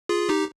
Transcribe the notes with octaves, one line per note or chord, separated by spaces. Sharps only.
F4 G#4
D#4 G4